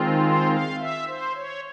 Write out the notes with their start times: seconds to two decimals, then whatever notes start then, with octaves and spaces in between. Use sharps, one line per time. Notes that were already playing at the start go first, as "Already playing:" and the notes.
Already playing: D#3 G#3 C4 F4
0.22 C5
0.50 F5
0.79 E5
1.07 C5
1.35 C#5